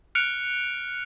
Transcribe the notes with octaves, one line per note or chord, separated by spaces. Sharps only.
F6 F#6 C#7 D7 F7